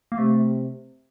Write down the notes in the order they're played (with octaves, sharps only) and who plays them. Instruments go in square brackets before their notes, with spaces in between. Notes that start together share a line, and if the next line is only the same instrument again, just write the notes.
[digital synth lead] A#3
[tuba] C3 [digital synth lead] A3